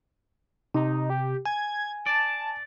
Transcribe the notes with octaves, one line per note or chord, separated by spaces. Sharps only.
C3 D#4
G4
G#5 G#6
D5 A5